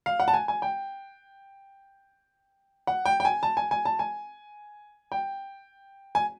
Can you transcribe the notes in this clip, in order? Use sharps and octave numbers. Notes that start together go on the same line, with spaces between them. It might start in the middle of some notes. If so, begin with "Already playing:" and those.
F5
F#5
A5
G#5
G#5
G5
F#5
G5
G5
G#5
A5
G#5
G#5
A5
G#5
G5
G#5